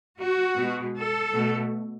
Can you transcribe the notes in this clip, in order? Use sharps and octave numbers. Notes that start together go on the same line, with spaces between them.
F#4
B2 G#3
A4
B2 A3